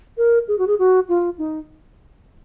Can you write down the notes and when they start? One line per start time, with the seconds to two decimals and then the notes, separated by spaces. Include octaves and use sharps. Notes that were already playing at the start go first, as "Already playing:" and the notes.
0.18 A#4
0.48 G#4
0.58 F#4
0.67 G#4
0.79 F#4
1.09 F4
1.38 D#4